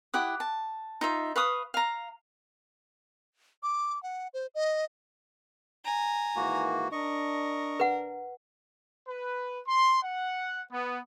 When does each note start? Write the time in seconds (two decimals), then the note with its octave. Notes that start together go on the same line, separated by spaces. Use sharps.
0.14 E4 G4 F#5 D#6
0.40 A5
1.01 D#4 F4 E5
1.36 B4 F5 C#6 D#6
1.74 F5 A#5
3.63 D6
4.03 F#5
4.34 C5
4.55 D#5
5.85 G#5 A#5
6.36 G#2 D#3 E3 A#3 F#4
6.92 D4 A#4 D#5 C#6
7.80 B4 F#5
9.08 B4
9.67 C6
10.03 F#5
10.71 B3